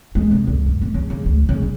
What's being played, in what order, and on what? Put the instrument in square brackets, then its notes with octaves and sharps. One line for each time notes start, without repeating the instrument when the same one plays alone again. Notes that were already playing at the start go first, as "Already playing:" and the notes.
[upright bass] G#3
C3
C#2
F#2
D1
C#3
C#3
D2
C#3
G3